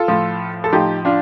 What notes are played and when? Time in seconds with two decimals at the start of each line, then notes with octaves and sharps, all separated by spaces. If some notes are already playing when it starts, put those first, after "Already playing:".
Already playing: F4 A4
0.08 A2 F3
0.64 A4
0.73 A2 F3 D#4 G4
1.05 D4 F4